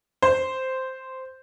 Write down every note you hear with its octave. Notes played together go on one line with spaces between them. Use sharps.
C5